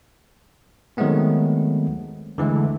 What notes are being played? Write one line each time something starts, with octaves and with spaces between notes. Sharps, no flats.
D#3 F#3 G#3 A3 B3 C4
D3 E3 G#3 A3